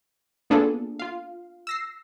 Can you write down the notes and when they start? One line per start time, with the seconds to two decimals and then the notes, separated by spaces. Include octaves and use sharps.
0.50 A#3 B3 D4 F4 G#4 A4
0.99 F4 F5
1.67 E6 A#6 C7